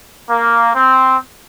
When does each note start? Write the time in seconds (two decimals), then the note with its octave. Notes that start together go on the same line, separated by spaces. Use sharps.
0.29 A#3
0.75 C4